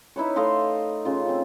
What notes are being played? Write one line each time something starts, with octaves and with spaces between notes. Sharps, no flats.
D#4 E4 B4 C#5
A3 D#5 F5 C6
C#3 F4
C4 F4